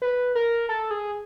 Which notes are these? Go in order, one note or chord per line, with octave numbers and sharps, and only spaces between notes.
B4
A#4
A4
G#4